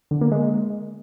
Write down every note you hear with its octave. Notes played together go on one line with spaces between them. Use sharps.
D3
A#3
G#3